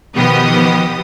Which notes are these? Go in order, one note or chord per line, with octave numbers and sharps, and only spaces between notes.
B2 D#3 F3 B3 G4 D#6